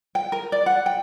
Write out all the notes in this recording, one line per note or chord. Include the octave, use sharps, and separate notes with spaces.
G5
A#4
D5
F#5
G5